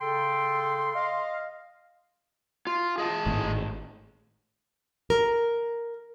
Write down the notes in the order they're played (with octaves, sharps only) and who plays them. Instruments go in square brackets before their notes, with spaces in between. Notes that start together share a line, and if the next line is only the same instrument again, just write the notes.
[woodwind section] C#3 A4 G5 [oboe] C6
[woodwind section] D#5 F5
[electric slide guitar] F4
G#4 D#5 A5
[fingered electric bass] G#1 A2
[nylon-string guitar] A#4